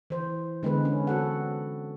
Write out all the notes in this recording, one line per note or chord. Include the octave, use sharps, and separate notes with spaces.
E3 C5
D3 G#3 B3 B4
C#4
C4 F#4 A4 F#5